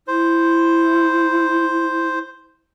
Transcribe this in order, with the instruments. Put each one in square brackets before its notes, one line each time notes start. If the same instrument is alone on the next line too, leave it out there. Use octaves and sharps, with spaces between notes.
[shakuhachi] E4 [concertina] C5